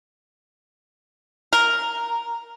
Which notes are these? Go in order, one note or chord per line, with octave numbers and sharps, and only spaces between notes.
A#4